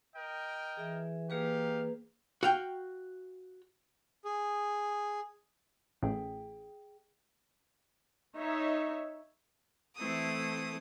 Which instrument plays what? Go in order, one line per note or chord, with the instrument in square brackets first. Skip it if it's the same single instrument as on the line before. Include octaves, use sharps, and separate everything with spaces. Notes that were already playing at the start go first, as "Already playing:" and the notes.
[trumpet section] A#4 D#5 G5
[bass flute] E3 [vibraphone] G#4 E5
[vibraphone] A#3 G#4 B4 [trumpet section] D#4 G4 F5
[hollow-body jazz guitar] F#4 F5 G5
[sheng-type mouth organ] G#4
[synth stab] A1 A2 [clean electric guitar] G#4 G5
[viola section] D#4 C#5 E5
[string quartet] E3 A3 C4 E4 A4 D#6